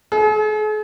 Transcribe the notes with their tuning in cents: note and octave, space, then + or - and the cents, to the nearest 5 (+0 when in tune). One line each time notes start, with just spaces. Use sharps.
G#4 +45